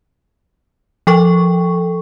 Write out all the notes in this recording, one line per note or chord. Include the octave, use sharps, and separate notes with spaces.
F3 A4 G5 C#6